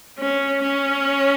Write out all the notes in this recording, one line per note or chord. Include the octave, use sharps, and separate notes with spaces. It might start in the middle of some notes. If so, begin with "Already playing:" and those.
C#4
C#4